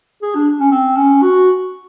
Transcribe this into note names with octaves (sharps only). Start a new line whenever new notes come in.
G#4
D4
C#4
C4
C#4
F#4